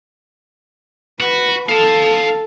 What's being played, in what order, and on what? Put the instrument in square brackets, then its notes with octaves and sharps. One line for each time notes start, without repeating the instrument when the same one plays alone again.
[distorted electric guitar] F#4 [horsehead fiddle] B4
[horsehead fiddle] A4 [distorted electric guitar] F5 A5